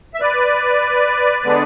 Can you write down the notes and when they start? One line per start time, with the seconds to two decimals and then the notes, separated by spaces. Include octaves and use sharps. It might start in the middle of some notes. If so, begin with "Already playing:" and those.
0.14 E5
0.20 B4 D5
1.44 D3 G#3 B3 D4